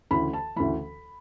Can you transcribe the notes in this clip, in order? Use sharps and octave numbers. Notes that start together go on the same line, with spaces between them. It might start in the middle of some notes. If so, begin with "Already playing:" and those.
D2 C#3 E3 B5
A5
D2 C#3 E3 B5